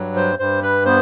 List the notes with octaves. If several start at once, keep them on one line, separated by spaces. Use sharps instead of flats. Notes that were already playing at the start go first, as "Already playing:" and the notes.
Already playing: G2 F#3
C5
G2 C5
B4
B3 C5